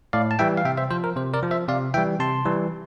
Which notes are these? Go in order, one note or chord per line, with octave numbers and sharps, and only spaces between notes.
A2 D5 F5
A5
E3 G3 E5 G5
F5
C3 E5 G5
C5 E5
F3 C5
A#4
C3 C5
A#4 D5
F3
C5 E5
C3 D5 F5
E3 G3 E5 G5
C3 A5 C6
E3 G3